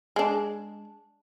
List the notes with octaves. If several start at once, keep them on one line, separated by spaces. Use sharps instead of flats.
G#3 D4